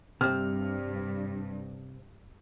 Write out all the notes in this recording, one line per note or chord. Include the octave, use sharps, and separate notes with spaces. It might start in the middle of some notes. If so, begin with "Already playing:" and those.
G2 C3 C4 F6